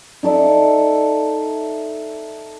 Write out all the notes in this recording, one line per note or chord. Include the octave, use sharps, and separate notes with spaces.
D#4 A4 D5 E5